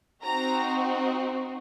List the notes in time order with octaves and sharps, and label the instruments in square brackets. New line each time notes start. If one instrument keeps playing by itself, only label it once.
[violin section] C4 D#4 F#4 A#5